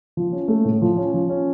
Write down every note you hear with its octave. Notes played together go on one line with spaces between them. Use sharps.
F3
C#4
A3
A2
F3
C#4
F3
C#4